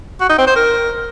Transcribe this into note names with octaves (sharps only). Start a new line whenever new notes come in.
F#4
D#4
C4
C5
A#4